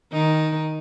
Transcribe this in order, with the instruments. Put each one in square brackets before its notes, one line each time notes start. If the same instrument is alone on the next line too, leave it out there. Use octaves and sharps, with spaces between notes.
[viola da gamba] D#3 D#4